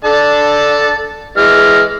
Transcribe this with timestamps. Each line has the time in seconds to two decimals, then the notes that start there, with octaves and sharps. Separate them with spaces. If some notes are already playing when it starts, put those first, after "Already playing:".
0.05 D4 A4 A5
1.37 E3 G#3 F6